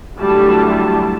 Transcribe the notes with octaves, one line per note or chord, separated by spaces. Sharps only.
D3 F#3 G3 A3 E4 A5